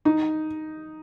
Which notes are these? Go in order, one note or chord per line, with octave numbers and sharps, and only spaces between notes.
D#4